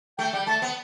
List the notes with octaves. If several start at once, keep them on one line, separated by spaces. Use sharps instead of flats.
A3 G5
G3 G5
A3 A5
B3